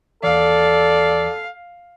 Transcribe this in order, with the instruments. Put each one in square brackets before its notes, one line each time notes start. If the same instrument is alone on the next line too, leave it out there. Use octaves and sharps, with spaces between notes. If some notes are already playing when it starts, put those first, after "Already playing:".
[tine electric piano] D#2 E3 [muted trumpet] A4 [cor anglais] D5 [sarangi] F5